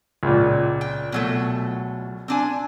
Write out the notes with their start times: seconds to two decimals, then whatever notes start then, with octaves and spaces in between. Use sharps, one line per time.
0.23 C#2 A#2
0.81 G5
1.12 B2 F#3 A3
2.28 C4 D4 G#5